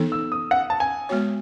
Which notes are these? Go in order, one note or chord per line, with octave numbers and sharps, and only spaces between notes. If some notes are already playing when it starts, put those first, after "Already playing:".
Already playing: E3 B3 D#4 A4
E6
D#6
F#5
A5
G#5
G#3 B3 F#4 C#5